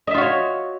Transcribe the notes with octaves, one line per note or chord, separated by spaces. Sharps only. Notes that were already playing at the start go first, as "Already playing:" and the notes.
F4 F#4 C#5 D#5 E5